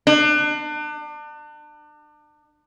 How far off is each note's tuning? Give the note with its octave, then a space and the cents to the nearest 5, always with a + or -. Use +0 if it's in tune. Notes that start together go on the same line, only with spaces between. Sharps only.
D4 +35